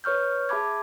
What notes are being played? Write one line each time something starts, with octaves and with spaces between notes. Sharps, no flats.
B4 C#5 C#6 F6 G6
G#4 E5 A5 B5 D6 G#6